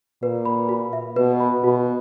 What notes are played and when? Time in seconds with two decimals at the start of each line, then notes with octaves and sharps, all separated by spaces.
0.22 A#2 B4
0.45 B5
0.69 F#4
0.93 E5
1.16 B2 B4
1.40 B5
1.63 B2 F#4